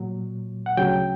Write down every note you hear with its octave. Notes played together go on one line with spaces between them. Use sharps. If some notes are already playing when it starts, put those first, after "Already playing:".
Already playing: A#2 F#3
F#5
D2 C#3 F#3 G5